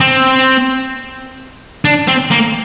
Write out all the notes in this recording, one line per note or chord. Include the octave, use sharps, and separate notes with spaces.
C4
D4
C4
A#3